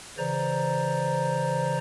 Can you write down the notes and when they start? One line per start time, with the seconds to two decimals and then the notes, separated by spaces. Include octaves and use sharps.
0.18 C#3 E3 C5 D5 A#5